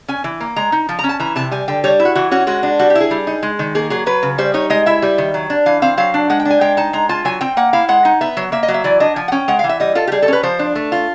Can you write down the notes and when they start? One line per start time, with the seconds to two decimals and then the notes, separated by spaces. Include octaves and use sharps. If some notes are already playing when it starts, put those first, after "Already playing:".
0.08 C#4 G#5
0.24 E3
0.41 A#3
0.56 G#3 A#5
0.72 D#4
0.89 F3
0.99 A#5
1.04 C#4
1.09 A5
1.20 E3 A#5
1.36 C3 A5
1.51 G3 G#5
1.68 D3 G5
1.84 G3 C#5
2.00 E4
2.05 F#4
2.15 E3 F#4
2.31 C#4 F#4
2.47 G#3 F#4
2.63 D4
2.79 G3 F#4
2.90 G4
2.95 E4
3.01 G#4
3.11 G3
3.27 D#4
3.43 G#3
3.59 D#3
3.75 A#3 G#4
3.90 F#3 G#4
4.06 F#3 B4
4.23 C#3
4.38 G3 C5
4.54 D#4 C#5
4.70 G#3 D#5
4.86 E4 E5
5.02 G3
5.18 D#3
5.34 F#3
5.50 D4
5.66 E3 F5
5.82 C4 F5
5.97 F#3 F5
6.14 D4
6.30 G#3 F#5
6.40 G5
6.45 D4
6.51 G#5
6.61 G#3 G5
6.77 D#4 A5
6.93 G#3 A#5
7.09 F4 A5
7.25 F#3 G#5
7.41 C4 G5
7.57 A#3 F#5
7.73 E4 F5
7.89 G#3 F#5
8.05 D#4
8.21 B3 E5
8.37 F#3
8.52 A#3 E5
8.63 D#5
8.68 F#3
8.74 E5
8.84 E3 D5
9.00 D4 D#5
9.16 F3 G#5
9.28 F#5
9.32 C#4 G5
9.48 G#3 F#5
9.59 F5
9.64 E3
9.69 E5
9.80 G3 D#5
9.95 F4 A4
10.07 G4
10.12 G3 G#4
10.22 A4
10.28 C#4 B4
10.43 F3 C5
10.59 D4
10.75 A3
10.92 F4